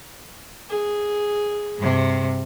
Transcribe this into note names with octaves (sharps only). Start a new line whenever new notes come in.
G#4
G2 C3